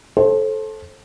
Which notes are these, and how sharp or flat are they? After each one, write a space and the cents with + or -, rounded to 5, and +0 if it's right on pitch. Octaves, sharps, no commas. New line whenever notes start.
A4 -10 C5 +25